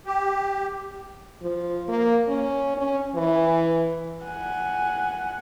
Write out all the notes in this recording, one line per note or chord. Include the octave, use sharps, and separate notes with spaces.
G4
F3
A#3
C#4
C#4
E3
F#5 G#5